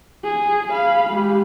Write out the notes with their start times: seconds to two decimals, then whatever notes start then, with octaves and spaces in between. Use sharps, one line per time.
0.24 G#4
0.71 F5 B5
1.10 G#3 G4